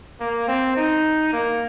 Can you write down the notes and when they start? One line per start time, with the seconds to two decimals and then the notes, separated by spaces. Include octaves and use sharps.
0.20 A#3
0.48 C4
0.77 D#4
1.33 A#3